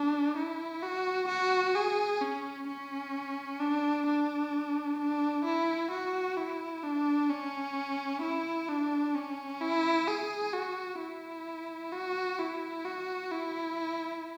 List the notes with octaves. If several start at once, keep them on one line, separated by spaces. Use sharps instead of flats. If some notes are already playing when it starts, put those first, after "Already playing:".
Already playing: D4
E4
F#4
F#4
G#4
C#4
C#4
D4
D4
D4
E4
F#4
E4
D4
C#4
E4
D4
C#4
E4
G#4
F#4
E4
F#4
E4
F#4
E4